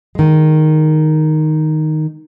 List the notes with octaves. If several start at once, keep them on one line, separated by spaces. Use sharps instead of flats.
D#3 G#3